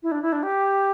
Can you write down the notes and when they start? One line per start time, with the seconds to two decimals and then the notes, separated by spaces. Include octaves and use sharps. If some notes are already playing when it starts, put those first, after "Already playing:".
0.03 E4
0.11 D4
0.22 E4
0.32 D4
0.43 G4